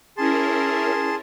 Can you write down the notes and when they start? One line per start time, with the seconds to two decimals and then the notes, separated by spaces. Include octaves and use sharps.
0.17 C#4 E4 G#4 A#4 A5 C6